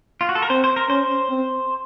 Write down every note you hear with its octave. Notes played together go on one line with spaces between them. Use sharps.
F4
F#4
A4
A#4
C4 C5
C5
A#4
C#4 C5
C4